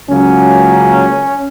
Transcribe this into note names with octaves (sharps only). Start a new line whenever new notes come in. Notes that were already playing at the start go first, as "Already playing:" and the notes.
C#2 C#3 F#3 A#3 C#4